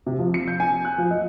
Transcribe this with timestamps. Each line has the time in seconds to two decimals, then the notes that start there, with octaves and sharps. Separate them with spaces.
0.06 C3
0.19 F3
0.34 C#7
0.48 G6
0.60 G#5
0.85 F#6
0.98 F3
1.11 D#5